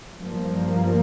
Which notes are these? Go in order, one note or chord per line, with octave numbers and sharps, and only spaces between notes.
G2 F3 A#3